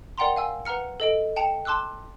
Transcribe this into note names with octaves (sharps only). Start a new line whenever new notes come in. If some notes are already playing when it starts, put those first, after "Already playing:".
A#4 D5 F#5 G5 A#5 C6
F5 G#5 E6
B4 F#5 A#5 F6 C#7
A4 D#5 D7
G5 A5 C#7 F7
A5 C6 D6 E6 F#6